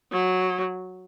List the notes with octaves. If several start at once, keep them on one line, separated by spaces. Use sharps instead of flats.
F#3